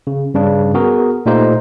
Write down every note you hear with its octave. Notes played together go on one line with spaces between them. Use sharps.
C#3
G2 C#3 D4
B3 F#4 G#4 A#4
A#2 A3 D#4 G4 C5 F5